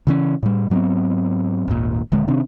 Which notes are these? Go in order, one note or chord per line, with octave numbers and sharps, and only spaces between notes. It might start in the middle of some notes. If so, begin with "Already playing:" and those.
C#3 E3 C#4
A2 G3
G#2 F#3 B3 C4
G#1 D#2 A#2
D#1 D3 G#3
C3 D#3 C4 D4